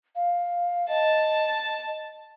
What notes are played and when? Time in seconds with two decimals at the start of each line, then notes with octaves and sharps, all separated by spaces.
0.16 F5
0.89 D#5 A5